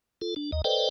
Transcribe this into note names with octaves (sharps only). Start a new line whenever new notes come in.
F4 A4
D4
D#2 D#5
A4 B4 C5 D5 D#5 G5